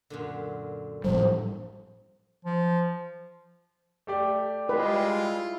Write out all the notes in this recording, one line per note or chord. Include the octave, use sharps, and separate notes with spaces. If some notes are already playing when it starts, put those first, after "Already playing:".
F#2 A#2 D3
A2 F3 G3 C5
F3
A3 G4 D5
G3 G#3 E4 F4 B4